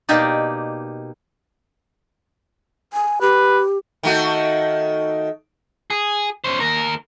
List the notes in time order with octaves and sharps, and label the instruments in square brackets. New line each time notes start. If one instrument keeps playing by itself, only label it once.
[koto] B2 A#3 D#4 G4 D5
[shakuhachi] G#5
[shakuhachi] G4 [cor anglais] B4
[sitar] D#3 A3 F#4
[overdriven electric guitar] G#4
C#4 C5
D#2 A#4